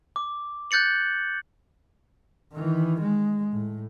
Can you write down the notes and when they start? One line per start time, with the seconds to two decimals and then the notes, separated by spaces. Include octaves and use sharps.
0.16 D6
0.71 F#6 G6 A6 C#7 F#7
2.53 D#3 E3
3.01 G#3
3.52 A2